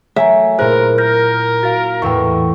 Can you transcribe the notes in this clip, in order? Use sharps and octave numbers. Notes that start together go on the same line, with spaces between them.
F#3 A3 C#5 E5 G#5 A#5
A#2 E4 G#4 A#4 C5 F#6
A#4 F6 G6 A#6
F#4 F5 A6 B6 D7
E2 A2 G5 C#6 E6